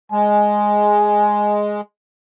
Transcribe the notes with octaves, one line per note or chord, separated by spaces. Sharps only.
G#3 G#5